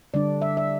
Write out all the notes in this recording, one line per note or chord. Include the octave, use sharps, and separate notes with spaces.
D3 G3 D4 D5
E5
E5